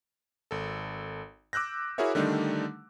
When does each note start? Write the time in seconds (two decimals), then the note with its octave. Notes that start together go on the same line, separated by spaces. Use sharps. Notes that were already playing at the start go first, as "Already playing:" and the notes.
0.51 G#1 A4
1.53 D6 E6 F#6 G6 A#6
1.98 E4 F#4 G#4 A#4 C#5 E5
2.15 D3 D#3 G3 A3 D4 D#4